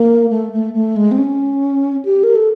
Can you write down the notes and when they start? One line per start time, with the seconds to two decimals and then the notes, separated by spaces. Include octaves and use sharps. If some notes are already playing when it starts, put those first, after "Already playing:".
Already playing: A#3
0.30 A3
0.53 A3
0.74 A3
0.96 G#3
1.11 C4
1.18 C#4
2.05 G4
2.24 A#4
2.35 A4